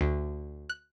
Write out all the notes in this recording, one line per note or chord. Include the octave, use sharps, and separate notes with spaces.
D2
F#6